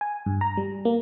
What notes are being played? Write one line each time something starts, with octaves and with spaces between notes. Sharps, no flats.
G#5
G2
A#5
G3
A#3